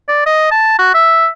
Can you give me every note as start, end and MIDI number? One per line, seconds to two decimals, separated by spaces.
0.09 0.23 74
0.26 0.49 75
0.51 0.77 81
0.79 0.90 66
0.94 1.28 76